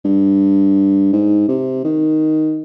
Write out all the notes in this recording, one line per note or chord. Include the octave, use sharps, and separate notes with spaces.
G2
G#2
C3
D#3